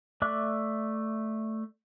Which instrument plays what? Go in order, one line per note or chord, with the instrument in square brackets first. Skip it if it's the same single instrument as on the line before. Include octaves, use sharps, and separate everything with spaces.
[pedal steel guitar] A3 D5 E5 D6 F#6